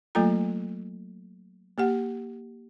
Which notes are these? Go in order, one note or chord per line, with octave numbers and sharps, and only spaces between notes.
F#3 A3 A#3 F4 A4 A#5
A#3 G4 F#5